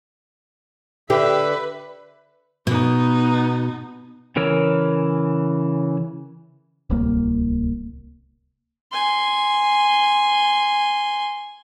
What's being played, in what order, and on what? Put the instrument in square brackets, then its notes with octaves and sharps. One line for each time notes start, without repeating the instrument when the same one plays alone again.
[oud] D3 G4 [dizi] B4 [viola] E5
[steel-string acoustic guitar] B2 [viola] B3 D#4
[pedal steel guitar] C#3 E3 A#4 C#5 E6
[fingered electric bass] D1 C2 A#3
[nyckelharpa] G#5 C6